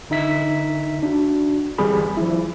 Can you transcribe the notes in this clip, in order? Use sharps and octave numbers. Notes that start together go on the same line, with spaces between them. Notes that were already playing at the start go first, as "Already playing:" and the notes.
D3 D#4 E5 B6
D4 F#4
G1 E3 G3 C4 G#4 B5
F3 E4